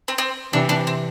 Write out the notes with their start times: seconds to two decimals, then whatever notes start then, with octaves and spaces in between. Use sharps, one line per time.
0.08 C4
0.18 C4
0.53 C3 E3 D4
0.69 D4
0.87 C4